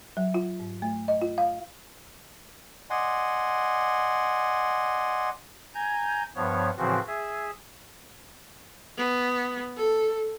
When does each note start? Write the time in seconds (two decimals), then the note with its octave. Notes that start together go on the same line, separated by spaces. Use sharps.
0.17 F#3
0.34 F4
0.60 G#2
0.82 A3
1.08 D#5
1.22 F4
1.38 F5
2.90 D5 D#5 F#5 G#5 C6
5.74 G#5 A#5 G6 G#6
6.36 G2 F3 B3 C#5
6.77 A2 C#3 E3 F3 C4 F#4
7.08 G#4 E5
8.97 B3
9.77 A4